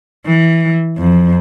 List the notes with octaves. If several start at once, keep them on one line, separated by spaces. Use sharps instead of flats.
E3
F2